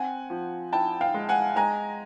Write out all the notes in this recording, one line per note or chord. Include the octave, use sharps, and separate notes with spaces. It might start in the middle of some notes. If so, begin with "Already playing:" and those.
Already playing: C4 F#5 G#5
F3
E4 G5 A5
F5 G5
G#3
F#5 G#5
G#3 G#5 A#5